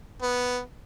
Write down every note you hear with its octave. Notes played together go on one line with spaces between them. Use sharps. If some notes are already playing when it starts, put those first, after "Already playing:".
B3